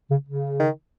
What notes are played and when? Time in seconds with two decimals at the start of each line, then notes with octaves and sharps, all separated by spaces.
0.10 C#3
0.27 C#3
0.59 D#3